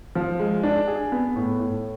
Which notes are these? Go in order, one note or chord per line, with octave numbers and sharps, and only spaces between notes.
F3
G#3
D4
G#4
B3
A2
A2